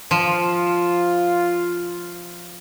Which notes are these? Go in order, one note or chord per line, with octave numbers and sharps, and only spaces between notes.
F3 F4